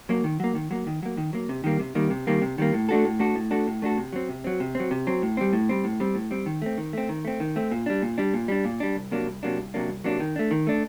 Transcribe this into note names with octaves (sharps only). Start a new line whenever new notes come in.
F#3 A#3
D#3
F#3 A#3
D#3
F#3 A#3
D#3
F#3 A#3
D#3
F#3 A#3
C3
D#3 G3 A#3
C3
D#3 G3 A#3
C3
D#3 G3 A#3
C3
D#3 G3 A#3
A2
A3 D4 F#4 A4
A2
A3 D4 F#4 A4
A2
A3 D4 F#4 A4
A2
A3 D4 F#4 A4
C3
F#3 C4
C3
F#3 C4
C3
F#3 C4
C3
F#3 C4
A2
G3 C4
A2
G3 C4
A2
G3 C4
A2
G3 C4
D#3
A3 C4
D#3
A3 C4
D#3
A3 C4
D#3
A3 C4
A#2
G3 D4
A#2
G3 D4
A#2
G3 D4
A#2
G3 D4
C2
C3 F#3 A#3 D4
C2
C3 F#3 A#3 D4
C2
C3 F#3 A#3 D4
C2
C3 F#3 A#3 D4
D#3
A3 D4
D#3
A3 D4